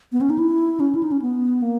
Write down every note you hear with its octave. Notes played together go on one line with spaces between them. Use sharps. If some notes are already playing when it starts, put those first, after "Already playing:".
B3
C#4
D#4
E4
C#4
E4
D#4
C#4
B3
A#3